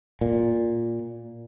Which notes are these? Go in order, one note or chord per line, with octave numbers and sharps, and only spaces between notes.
A#2